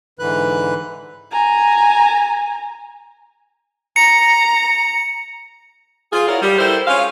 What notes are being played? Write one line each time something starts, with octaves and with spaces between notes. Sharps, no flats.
G#2 D3 E3 B4 F#6
G#5 A#5
A#5 C#7
F4 G#4
E4 F#4 A#4 C#5 D5 F5
G3
E4 G4 A4 A#4 C5
G#3 C#4 F4 F5